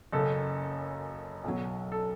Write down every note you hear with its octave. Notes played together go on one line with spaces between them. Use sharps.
F#1 F#2 C#3 A4
B1 B2 F#3
A4